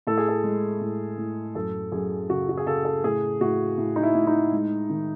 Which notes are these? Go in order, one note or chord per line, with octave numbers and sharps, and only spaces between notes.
A2 A4
G#4
A4
G#3
A2
A2
F#2 A4
F#2 G#4
C#3 F#4
F#4
G#4
C#3 A4
A4
A2 G#4
A2 F#4
A2
D#4
E4
A2
D#4
G#3
D#3